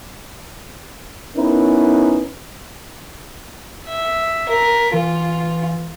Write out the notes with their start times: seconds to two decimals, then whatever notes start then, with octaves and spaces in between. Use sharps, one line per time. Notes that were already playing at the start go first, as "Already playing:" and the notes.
1.35 B3 C#4 D#4 E4 A#4 B4
3.87 E5
4.49 A#4 B6
4.93 E3 F4